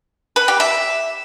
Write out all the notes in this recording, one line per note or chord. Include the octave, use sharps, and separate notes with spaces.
B4
G4
E5